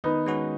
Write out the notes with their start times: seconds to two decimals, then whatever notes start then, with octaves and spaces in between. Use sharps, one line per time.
0.04 D#3 B3 D#4
0.26 G#3 C#4 F#4 B4